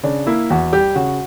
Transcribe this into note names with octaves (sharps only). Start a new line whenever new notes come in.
C#3 D4
A#3 E4
E2 F#4
G3 G4
C#3 F#4